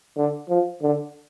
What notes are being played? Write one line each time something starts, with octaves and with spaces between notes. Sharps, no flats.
D3
F3
D3